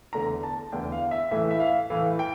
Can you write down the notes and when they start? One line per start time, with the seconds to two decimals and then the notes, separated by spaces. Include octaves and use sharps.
0.13 E2 D3 A3 A#5
0.43 A5
0.72 E2 D3 A3 G5
0.92 F5
1.11 E5
1.31 A2 E3 A3 E5
1.51 E5
1.60 F5
1.90 A2 E3 A3 F5
2.19 G5